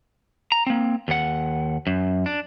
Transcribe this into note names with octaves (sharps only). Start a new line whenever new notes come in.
A#5
A#3 C4
D#2 F#5
F#2
D4